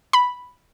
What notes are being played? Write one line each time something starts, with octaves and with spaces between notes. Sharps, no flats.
B5